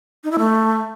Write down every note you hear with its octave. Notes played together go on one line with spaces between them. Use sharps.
D#4
E4
A3